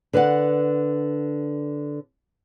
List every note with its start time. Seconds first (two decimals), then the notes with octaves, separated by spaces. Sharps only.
0.13 D3 B4 D5 F#5